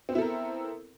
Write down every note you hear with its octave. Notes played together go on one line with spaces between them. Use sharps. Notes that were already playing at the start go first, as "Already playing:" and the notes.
B3 C4 E4 A4 A#4